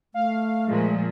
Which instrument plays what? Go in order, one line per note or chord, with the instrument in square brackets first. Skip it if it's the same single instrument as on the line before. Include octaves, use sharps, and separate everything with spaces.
[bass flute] A3 [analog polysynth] F5
[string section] A#2 F3 [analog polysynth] G#3